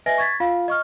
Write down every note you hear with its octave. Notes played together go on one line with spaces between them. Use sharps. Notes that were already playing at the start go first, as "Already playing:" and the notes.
B4 D#5 E5 G#5 A#6
C#6 G#6 A6 B6
F4 F5
D#5 C#6 F6